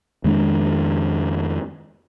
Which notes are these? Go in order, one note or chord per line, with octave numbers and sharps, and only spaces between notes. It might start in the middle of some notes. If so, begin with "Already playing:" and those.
F2 D#3 G#3 D4